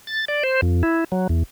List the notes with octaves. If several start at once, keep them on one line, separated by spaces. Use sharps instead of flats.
A6
D5
C5
F2
E4
F#3
E2